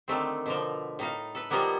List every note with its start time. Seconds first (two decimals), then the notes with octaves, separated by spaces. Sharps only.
0.08 D3 D#3 A3 C4
0.46 B2 D3 F3
0.99 A2 D#4 F5
1.35 A4 B4
1.50 D#3 F3 G3 A#3 B3 E4